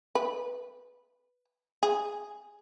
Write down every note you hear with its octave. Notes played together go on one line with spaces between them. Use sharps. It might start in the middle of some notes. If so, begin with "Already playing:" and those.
B4
G#4